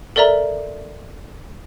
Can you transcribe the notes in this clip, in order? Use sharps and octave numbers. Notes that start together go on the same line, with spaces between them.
A4 A#4 D5 E5 A#5